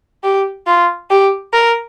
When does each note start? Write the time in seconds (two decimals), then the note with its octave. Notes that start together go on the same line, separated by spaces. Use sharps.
0.24 G4
0.67 F4
1.10 G4
1.53 A#4